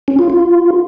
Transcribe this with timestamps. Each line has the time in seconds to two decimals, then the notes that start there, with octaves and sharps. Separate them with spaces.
0.08 C#4
0.19 F4
0.30 F4